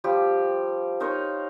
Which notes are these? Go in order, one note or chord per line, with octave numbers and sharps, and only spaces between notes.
F3 G3 G4
D#4 A#4 C5 C#5